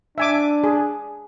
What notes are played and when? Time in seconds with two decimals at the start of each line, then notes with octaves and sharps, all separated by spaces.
0.18 D4 E5 G#5 D6
0.64 G#4